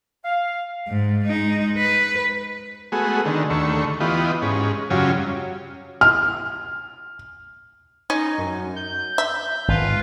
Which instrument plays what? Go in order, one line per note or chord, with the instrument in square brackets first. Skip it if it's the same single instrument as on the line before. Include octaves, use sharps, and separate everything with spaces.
[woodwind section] F5
[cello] G#2
G#3 D#4
B4
[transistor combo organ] G#3 A3 B3 F#4 G#4
D3 D#3
D#2 D3 A3 C#6
E3 B3 F4 G4 D#5
G#2 C#4
F#2 C#3 F#3 G3 C#4 F4
[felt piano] F6
[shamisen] C#4 [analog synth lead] D#4
[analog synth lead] F#2
G6
[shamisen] E5
[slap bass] G#1 [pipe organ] F4 B4 F5